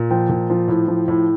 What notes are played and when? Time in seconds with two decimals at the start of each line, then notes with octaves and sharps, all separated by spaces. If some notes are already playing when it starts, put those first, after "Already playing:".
Already playing: A#2
0.10 F3 G5
0.29 A#2
0.50 F3
0.68 A2
0.88 F3
1.08 A2